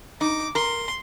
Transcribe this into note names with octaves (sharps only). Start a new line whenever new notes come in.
D#4 D6
A#4 C6